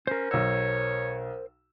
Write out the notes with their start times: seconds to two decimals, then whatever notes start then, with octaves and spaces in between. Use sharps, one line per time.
0.07 C#4 A#4 C5
0.31 B1 C#5 E6